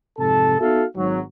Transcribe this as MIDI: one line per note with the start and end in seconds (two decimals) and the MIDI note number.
0.19 0.57 41
0.19 0.57 44
0.19 0.57 48
0.19 0.57 69
0.19 0.57 81
0.61 0.85 59
0.61 0.85 63
0.61 0.85 66
0.61 0.85 69
0.61 0.85 76
0.61 0.85 77
0.97 1.21 32
0.97 1.21 54